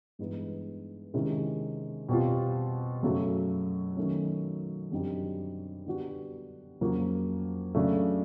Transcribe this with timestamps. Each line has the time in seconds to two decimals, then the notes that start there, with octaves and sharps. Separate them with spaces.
0.19 G2 E3 G#3 B3 D#4
1.14 C3 D#3 G#3 C#4 E4
2.09 B2 G3 C4 F4
3.03 F#2 C#3 F#3 A3
3.97 D#3 F#3 A3 C#4
4.92 F#2 D3 G3 C4 D#4
5.86 D3 G3 B3 D4 F#4
6.81 F2 C#3 F#3 A#3
7.75 C#3 F#3 A3 D4